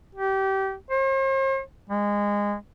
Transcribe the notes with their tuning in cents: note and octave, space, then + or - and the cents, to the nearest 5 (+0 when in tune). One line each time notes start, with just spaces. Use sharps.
G4 -25
C5 +45
G#3 -20